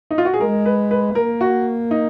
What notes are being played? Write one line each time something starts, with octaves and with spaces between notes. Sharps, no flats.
D#4
F4
F#4
G#4
G#3 A#4
B4
B4
A#3 A#4
F#4
D#4